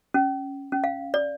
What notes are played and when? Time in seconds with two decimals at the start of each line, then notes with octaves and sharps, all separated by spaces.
0.14 C#4
0.72 C#4
0.84 F5
1.14 D5